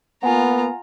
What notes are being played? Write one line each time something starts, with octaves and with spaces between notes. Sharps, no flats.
A#3 B3 F4 F#5 G#5 A#5